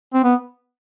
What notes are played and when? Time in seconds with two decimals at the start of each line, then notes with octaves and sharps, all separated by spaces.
0.14 C4
0.24 B3